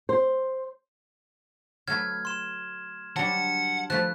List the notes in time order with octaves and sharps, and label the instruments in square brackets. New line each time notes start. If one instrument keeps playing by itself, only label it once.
[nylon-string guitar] C5
[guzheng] F#3 A3 B4 [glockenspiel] F6 G#6
[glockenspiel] C6 E7
[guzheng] F#3 G3 D4 [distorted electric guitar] F#5 [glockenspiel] A5
[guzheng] F3 A3 B4 [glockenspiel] F#6